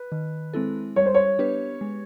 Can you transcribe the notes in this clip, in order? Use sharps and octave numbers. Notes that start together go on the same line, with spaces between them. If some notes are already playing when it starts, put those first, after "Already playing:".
Already playing: B4
D#3
G#3 C4 E4 A4
G3 C#5
C5
C#5
B3 D4 G4 B4
G#3